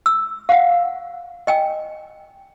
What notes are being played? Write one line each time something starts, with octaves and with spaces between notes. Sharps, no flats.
E6
F5 F#5
D#5 G5 G#5